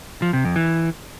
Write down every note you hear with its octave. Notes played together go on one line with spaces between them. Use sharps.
F3
C3
F2
E3